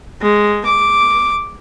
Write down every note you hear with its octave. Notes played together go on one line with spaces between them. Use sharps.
G#3
D6